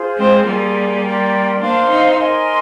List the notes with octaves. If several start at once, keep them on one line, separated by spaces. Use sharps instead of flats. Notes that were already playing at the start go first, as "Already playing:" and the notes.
Already playing: F4 G#4 C5
G#3 C4
G3 A#3 G#4 D5 G#5 C6
A#4 D5 G5 C6
A#3 D4 C5 F5 C6
C4 D#4
A#4 D#5 G#5 C6